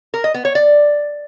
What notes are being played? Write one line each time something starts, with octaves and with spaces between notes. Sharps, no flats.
A#4
D#5
B3
C#5
D5